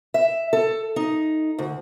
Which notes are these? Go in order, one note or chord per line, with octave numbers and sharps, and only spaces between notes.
E5
A4
D#4
D2